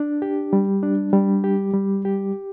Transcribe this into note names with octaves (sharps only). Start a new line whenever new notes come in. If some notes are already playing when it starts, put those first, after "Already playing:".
Already playing: D4
G4
G3
D4
G3
G4
G3
G4